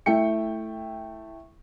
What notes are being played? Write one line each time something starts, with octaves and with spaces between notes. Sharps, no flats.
A3 E4 G5 C#7